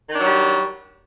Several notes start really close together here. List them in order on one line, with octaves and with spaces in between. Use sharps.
D#3 D4 F#3 G3